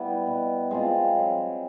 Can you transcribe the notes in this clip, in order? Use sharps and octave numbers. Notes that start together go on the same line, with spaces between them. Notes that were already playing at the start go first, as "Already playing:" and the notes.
Already playing: G3 B3 E4
B2
G#3 C4 F4
F#3